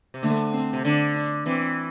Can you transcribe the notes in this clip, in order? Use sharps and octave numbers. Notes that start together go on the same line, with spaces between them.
C3
D3 A3
C4
C3
D3 D4
D4
E3 C4